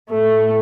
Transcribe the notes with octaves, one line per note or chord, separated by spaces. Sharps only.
A2 A3